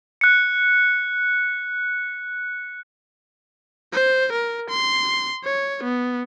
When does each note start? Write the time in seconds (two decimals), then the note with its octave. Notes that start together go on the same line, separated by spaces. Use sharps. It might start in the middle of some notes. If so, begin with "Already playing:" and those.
0.21 F#6 C#7
3.93 C5
4.32 A#4
4.70 C6
5.44 C#5
5.83 B3